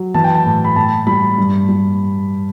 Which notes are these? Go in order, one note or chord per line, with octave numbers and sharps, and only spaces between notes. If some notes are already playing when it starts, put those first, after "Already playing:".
Already playing: F#3
E3 A5
G5
A5
A2
B5
A2 A5
G3 B5
G2
G3